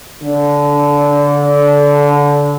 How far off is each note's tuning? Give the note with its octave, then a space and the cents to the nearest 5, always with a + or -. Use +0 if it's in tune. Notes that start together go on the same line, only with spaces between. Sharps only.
D3 -20